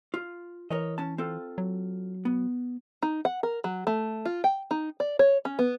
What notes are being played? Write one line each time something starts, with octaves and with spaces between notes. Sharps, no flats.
F4
E3 A#4 C#5 D#5
C#4 A5
C4 F4 A4
F#3
B3
D#4
F#5
A#4
F#3
A3
F4
G5
D#4
D5
C#5
C#4
B3